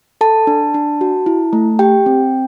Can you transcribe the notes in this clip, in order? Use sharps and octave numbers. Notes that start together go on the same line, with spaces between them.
A4 A5
D4
D4
F#4
E4
A3
G4 G5
C4